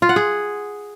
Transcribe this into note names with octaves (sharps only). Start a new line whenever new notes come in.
F4
F#5
G#4